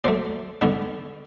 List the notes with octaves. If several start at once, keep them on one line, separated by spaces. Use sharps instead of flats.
A#2 F#3 A3 C5 D5
G2 D3 G3 B3 D4